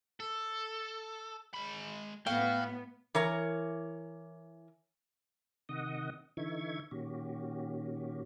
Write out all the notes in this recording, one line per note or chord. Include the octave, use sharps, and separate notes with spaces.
A4
G#3 B5
A2 B3 F#4 F5 G5
E3 A#4 C#5
C3 D#3 D#5 F#5 D#6
D3 E3 D#4 E5 C#6 G#6
A#2 D#3 C#4 F#4 G4